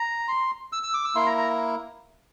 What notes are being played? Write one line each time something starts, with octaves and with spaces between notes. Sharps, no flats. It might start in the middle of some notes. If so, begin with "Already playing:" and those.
Already playing: A#5
C6
E6
E6
D6
E6
A#3 E4 C6
A#5
A#5